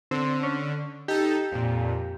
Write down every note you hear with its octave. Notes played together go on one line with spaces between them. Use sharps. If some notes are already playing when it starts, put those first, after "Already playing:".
D3 C4
C#4
D#4 G4 A4
F2 A#2